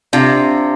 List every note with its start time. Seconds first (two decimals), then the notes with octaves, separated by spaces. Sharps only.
0.13 C3 D4 F4 D5 F5